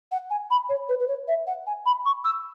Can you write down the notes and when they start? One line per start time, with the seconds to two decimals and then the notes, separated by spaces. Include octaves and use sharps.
0.12 F#5
0.30 G#5
0.51 B5
0.69 C#5
0.89 B4
1.00 B4
1.08 C#5
1.28 E5
1.47 F#5
1.67 G#5
1.86 B5
2.05 C#6
2.25 E6